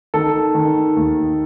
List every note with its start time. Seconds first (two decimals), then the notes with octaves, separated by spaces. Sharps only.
0.14 D#3 A4
0.55 D#3
0.97 D#2